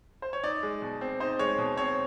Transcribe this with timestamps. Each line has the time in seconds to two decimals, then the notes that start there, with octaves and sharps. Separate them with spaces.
0.22 C5
0.33 C#5
0.44 D#4 D5
0.63 G#3
0.82 B2
1.01 C4
1.20 D#4 C5
1.39 G#3 C#5
1.58 B2
1.77 C4 C#5